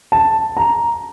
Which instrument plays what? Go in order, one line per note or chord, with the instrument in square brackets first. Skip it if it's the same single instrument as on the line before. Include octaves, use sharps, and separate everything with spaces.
[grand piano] A5
A#5